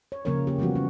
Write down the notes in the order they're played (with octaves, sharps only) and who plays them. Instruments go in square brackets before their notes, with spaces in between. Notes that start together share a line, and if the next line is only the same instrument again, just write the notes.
[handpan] C#5
C#3 F3 A#3 C#4 A#4 C#5
A#3 G4
E3 F3 G3 B3 F#4
C#4